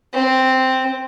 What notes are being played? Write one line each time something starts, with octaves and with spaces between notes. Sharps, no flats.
C4